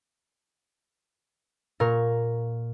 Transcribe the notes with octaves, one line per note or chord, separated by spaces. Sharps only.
A#2 A#4 C#6